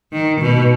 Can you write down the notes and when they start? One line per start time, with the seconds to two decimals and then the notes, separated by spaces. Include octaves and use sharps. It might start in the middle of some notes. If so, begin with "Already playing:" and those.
0.12 D#3
0.41 B2